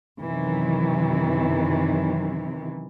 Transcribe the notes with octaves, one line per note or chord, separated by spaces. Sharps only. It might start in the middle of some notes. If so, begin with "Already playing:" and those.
F#2 C3 D#3 E3